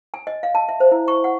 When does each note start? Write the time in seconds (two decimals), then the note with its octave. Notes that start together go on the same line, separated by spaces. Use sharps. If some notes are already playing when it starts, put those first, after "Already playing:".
0.14 G#5
0.27 D#5
0.43 F5
0.55 A5
0.69 E5
0.80 C5
0.92 E4
1.08 C#6
1.24 F#5